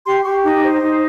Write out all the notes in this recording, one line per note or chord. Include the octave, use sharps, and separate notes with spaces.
G4 C6
G4 C#6
D#4 D6
C5
D#4